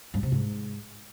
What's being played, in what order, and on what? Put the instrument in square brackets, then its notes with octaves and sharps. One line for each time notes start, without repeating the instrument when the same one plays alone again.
[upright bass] G2
C3
G#2